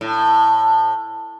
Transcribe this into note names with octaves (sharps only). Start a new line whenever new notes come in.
A2